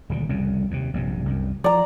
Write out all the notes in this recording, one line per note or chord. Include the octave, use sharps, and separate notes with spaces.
D#1 D2 D3
C2 F2 C#3
D#2 C3
A#1 G2 C3
C2 F#2
F3 D5 A#5